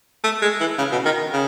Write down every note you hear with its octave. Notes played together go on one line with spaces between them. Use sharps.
A3
G#3
E3
C#3
B2
D#3
C#3